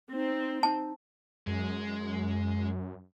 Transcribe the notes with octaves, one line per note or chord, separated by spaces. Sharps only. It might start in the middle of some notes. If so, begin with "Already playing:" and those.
C4 D#4
D#4 A5
F#2 G#3